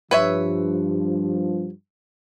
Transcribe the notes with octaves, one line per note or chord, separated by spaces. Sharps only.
G2 F3 B4 C#5 E5